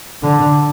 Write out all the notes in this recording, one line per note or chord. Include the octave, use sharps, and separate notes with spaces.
D3